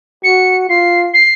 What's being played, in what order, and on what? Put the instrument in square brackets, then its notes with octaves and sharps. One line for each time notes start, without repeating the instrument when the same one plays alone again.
[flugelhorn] F#4 [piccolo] C#7
[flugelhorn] F4 [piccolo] C7
[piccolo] C7